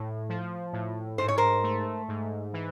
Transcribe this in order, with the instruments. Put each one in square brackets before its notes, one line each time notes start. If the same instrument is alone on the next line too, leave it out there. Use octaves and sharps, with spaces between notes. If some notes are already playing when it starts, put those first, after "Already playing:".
Already playing: [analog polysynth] A2
F3
A2
[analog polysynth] G#2 [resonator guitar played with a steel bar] C5
[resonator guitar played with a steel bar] C#5
A#4 C5
[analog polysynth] A3
G#2
E3